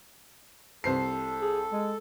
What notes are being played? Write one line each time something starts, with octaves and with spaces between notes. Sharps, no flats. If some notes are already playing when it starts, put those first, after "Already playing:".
C2 A4 C5 C7
G#4
G#3